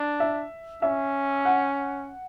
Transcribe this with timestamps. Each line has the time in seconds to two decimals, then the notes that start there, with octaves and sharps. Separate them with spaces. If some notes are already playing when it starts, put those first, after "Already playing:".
Already playing: D4
0.20 E5
0.82 C#4 E5
1.45 F#5